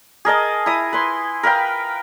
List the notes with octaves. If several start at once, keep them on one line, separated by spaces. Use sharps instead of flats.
G#4 A#4 D#5 A5
E4 A#5 D#6
B4 C6
A#4 B4 F5 G5